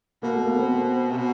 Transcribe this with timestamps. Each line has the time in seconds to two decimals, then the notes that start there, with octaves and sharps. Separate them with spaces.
0.23 B2 A#3
0.34 A3
0.47 A#3
0.58 C4
1.11 C3
1.17 B2